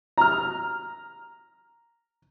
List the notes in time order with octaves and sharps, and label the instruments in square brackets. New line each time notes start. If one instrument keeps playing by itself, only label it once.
[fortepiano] A#5 F6